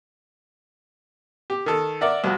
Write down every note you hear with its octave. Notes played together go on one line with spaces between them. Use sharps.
G4
D#3 A4
A#4 D5 E5 F#5
C2 F2 F#4